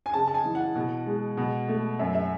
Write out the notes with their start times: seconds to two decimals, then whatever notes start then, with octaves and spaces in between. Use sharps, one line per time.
0.06 G#5
0.13 C#3 A5
0.27 A5
0.34 G#5
0.45 E3
0.55 F#5
0.75 B2
1.06 G#3
1.37 B2
1.68 A3
1.99 F#2 E5
2.15 E5